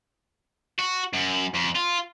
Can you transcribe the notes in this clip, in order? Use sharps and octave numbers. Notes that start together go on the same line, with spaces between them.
F#4
F#2
F2
F4